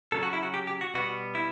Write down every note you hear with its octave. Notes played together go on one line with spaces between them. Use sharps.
C#3 F#3 C#4 A4
F#4
E4
F#4
G4
G4
F#4
B2 G3 B3 F#4
E4